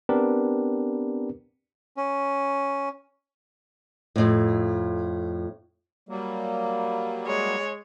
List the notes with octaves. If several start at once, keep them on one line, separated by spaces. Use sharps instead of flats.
B3 C4 D4 G4 A#4 B4
C#4
F2 A2
F#3 G3 A#3
G#3 C#5